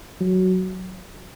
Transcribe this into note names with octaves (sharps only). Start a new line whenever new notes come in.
F#3